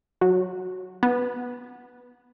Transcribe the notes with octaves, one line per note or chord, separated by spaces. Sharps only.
F#3
B3